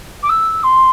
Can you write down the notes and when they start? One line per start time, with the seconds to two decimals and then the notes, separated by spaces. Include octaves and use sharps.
0.22 D6
0.29 E6
0.63 C6